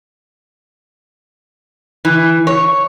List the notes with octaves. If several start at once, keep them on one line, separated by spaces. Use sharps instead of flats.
E3
C#5